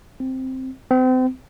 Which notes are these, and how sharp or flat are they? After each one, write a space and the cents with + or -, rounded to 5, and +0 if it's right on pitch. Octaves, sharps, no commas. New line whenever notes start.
C4 +0
C4 -35